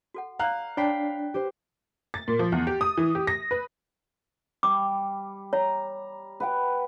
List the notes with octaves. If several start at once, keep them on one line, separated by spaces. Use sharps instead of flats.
F#4 A4 F#5
D5 F5 A#5 F#6
D4 C#5 G5 B5 B6 C7
G4 C5
A6
A#2
F3
E2
G4
D#6
E3
G4
A#6
B4
G3 D6
C#5 A#5
B4 F#5 G5